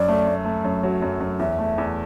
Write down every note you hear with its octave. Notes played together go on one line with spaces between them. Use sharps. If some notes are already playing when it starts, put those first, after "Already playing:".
Already playing: F#2 D5
A3
A3
A3
F#2
F#3
F#2
F#2
E2 E5
A3
E2